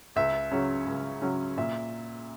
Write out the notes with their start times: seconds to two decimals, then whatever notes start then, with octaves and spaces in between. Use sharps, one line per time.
0.16 C#2 E5
0.51 C#3 F#3 C#4
0.86 C#2
1.22 C#3 F#3 C#4
1.57 A#2 E5